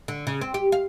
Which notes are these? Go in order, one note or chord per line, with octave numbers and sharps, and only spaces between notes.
D3
C#3
C4
G4
F5